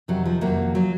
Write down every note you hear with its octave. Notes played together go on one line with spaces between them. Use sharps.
F2 C3 D#3 F#3
F3
F2 C3 D#3 F#3 A#3
F3 F#3